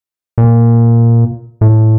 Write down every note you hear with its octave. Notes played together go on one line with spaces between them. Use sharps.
A#2
A2